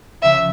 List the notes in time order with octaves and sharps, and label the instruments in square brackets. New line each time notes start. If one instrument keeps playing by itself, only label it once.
[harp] C#2 C#3 F3 [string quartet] E5